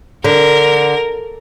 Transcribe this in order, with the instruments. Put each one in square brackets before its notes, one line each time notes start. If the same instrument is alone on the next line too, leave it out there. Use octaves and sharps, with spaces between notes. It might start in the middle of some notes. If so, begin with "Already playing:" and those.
[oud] D3 [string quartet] A#4